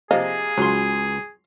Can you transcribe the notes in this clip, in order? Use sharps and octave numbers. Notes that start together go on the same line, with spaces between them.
C3 F3 A#3 G#4 D#5 F5
C#2 F#3 C6